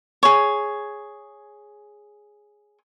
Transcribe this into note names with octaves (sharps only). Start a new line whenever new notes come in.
G#4 C#5